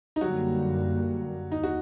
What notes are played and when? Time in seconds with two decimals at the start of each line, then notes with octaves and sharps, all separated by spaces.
0.16 D#4
0.20 F#2 D3 F#3 G3 A#3 F#4
1.52 D#2 D#4
1.63 F#4